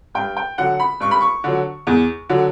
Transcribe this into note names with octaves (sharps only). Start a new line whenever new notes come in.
G2 G5
G5
D3 F#3 F#5
B5
G2 C#6
B5
C#6
D3 F#3
E2
D3 F#3